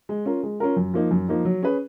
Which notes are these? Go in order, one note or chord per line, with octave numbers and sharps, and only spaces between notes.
G#3
C#4 F4 A#4
G#3
C#4 F4 A#4
F#2
F3 A#3 D#4
F#2
F3 A#3 D#4
F#3
C#4 G#4 B4